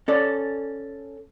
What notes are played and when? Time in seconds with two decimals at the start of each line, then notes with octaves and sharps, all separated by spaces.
0.08 C#4 A4 D5